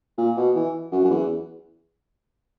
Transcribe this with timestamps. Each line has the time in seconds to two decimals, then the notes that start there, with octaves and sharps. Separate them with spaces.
0.18 A#2
0.37 B2
0.55 E3
0.92 F#2
1.04 F#2
1.10 E2